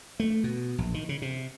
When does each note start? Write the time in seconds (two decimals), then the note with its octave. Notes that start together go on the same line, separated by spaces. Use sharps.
0.20 A3
0.44 B2
0.78 A#1
0.94 D#3
1.09 C#3
1.22 C3